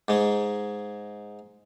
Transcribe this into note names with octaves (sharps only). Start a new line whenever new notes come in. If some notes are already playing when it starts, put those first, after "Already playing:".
G#2 G#3